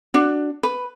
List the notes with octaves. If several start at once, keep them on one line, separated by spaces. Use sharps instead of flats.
D4 F#4
B4